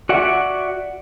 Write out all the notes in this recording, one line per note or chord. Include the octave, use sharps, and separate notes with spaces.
F#4 D5 E5 F#5